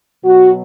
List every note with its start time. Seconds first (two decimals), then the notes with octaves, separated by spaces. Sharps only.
0.24 B2 F#3 F#4